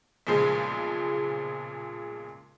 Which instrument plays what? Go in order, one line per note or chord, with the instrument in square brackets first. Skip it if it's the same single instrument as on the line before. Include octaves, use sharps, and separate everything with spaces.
[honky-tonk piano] B1 A#2 C#3 F3 G#3 C7